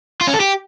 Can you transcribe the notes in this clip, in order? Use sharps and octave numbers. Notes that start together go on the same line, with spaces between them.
F4
C#4
A4
G4